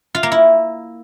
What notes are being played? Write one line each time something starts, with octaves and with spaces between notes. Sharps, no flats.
F4
A#3
E4